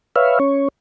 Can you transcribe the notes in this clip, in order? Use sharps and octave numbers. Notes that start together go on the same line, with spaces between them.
B4 C#5 E5 F5
C#4 C#5